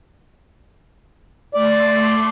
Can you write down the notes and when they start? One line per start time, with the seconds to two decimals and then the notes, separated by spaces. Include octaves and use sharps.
1.54 A3 D5 C6